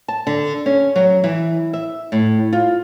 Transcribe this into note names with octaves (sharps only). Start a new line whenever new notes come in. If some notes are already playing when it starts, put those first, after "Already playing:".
A5
D3
C#4
F#3
E3
E5
A2
F4